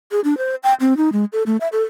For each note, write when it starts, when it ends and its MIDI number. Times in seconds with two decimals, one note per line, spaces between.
0.12 0.20 68
0.24 0.37 62
0.38 0.55 72
0.63 0.74 79
0.80 0.97 60
0.97 1.09 63
1.13 1.25 56
1.33 1.43 69
1.46 1.57 57
1.60 1.68 76
1.72 1.83 69